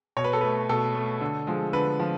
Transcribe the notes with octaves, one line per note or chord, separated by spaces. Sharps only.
B2 C#5
B4
A4
A3 B4
B2 A4
A3
D3
F3 G#3
D3 B4
F3